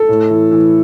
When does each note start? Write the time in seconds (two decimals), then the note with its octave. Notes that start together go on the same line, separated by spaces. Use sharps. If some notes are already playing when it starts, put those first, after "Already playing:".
Already playing: A4
0.09 A2
0.30 E3
0.51 E3